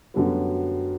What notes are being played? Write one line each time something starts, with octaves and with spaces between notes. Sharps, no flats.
F#2 D3 G3 B3